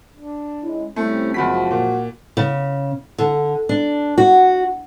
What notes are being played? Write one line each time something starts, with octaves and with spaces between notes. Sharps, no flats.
D4
G#3 C#4 E4
C3 G3 A3 C4 C#4 E4
F#1 F3 F#3 G#3 F#4 B5 B6
A#2
C#3
D3
D4
F#4